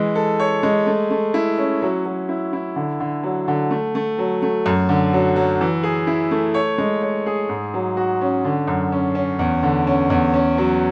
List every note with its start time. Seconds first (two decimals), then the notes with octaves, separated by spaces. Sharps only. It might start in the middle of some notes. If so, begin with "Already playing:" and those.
Already playing: E3 G#3
0.15 A4
0.39 C#5
0.63 G#3
0.87 A3
1.11 A3
1.34 E4
1.58 C#4
1.82 F#3
2.05 F#3
2.29 E4
2.53 E4
2.76 D3
3.00 D3
3.23 F#3
3.48 D3
3.71 A3
3.95 A3
4.18 F#3
4.42 A3
4.66 F#2
4.89 D3
5.13 F#3
5.36 F#3
5.61 E3
5.83 G#4
6.07 E4
6.31 A3
6.54 C#5
6.78 G#3
7.02 C#5
7.26 G#4
7.49 G#2
7.74 F#3
7.97 F#4
8.21 C#4
8.45 D3
8.67 F#2
8.92 C#4
9.15 C#4
9.39 E2
9.63 D3
9.87 C#4
10.10 E2
10.34 C#4
10.58 F#3